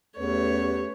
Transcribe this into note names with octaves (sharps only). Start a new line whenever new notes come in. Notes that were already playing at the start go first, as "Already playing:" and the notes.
E2 A3 C#4 G4 B4 C#5